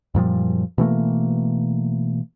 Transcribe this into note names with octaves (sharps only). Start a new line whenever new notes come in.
F#2 A#2 F3 G3
B2 E3 A3 A#3